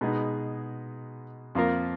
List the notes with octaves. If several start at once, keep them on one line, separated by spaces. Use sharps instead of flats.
B2 G#3 B3 D#4 G#4
F2 F3 A#3 F4 A#4